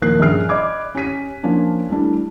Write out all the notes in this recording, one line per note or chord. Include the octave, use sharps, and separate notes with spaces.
D#2 A#2 F3 A#4 F#6 C7
A#1 G2 C#4 G#4 F6 C7
D5 D#5 B5 D6 G#6
C#4 G4 B6 D#7
F3 A#3 C#4 D4
E3 G3 A3 D4